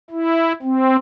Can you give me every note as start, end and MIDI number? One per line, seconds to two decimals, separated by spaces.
0.11 0.53 64
0.62 0.96 60